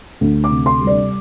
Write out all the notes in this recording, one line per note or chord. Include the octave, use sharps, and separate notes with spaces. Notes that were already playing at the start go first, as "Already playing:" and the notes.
D2
D6
C3
C6
G3
D5